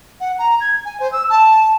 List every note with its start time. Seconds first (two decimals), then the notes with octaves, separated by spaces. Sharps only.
0.20 F#5
0.38 A#5
0.60 G#6
0.85 G#5
1.00 C5
1.12 E6
1.29 A5